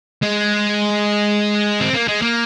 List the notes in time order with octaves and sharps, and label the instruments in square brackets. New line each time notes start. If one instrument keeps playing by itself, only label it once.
[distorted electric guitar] G#3
C4
A#3
G#3
A#3